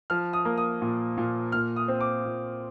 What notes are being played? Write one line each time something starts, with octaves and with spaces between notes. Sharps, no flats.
F3 F6
D#6
A#3
D#6
A#2
A#2
A#2 F6
D#6
C4
D6
A#2